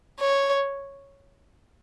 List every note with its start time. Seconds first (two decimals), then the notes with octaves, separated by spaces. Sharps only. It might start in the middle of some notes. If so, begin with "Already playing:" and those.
0.20 C#5